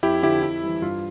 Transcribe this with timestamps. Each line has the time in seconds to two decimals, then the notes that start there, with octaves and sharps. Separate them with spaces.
0.03 F2 E4 G4
0.23 D3 F3 E4 G4
0.43 F2 E4
0.63 E3 G3
0.82 G2 F4